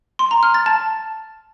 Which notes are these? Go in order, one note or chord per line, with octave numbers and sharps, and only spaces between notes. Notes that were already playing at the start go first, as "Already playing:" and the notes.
C6
A#5
F6
A6
A5